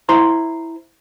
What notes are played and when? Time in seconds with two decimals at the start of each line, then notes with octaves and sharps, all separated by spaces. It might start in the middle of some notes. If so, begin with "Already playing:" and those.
0.09 E4 C5 A#5 C6